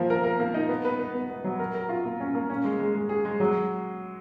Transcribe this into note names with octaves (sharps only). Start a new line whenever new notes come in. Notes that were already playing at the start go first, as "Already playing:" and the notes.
Already playing: F3 A#3
A#4
A#4
A#3
D#4
B3
B4
B3
B3
B3
F#3
A#4
A#4
F4
A#3
C#4
A#3
C#4
G#3
G#3
G#3
G#4
G#3
F#3